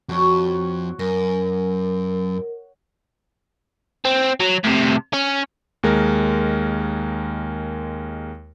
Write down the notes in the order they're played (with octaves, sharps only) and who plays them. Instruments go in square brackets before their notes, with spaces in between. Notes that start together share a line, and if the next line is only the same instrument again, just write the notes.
[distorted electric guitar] F2 [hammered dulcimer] F#4 C#5
[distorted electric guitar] F#2 [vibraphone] A#4
[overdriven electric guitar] C4
F#3
A2 C3
C#4
[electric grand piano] D#2 G#3 A#4